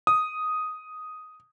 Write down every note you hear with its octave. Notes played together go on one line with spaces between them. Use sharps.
D#6